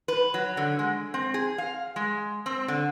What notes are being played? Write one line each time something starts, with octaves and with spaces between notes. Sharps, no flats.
B4
F#3
D3
G#3
C4
G#4
F5
G#3
C4
D3